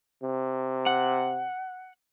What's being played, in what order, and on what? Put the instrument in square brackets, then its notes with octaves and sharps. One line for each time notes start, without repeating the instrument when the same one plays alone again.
[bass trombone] C3
[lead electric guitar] F#5